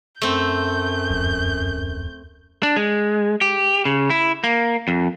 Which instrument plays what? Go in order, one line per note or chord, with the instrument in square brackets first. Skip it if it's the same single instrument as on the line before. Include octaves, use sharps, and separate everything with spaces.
[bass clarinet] F#2 [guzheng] A3 C4 [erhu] G6
[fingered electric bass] D1 F2
[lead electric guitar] D4
G#3
G4
C#3
E4
A#3
F2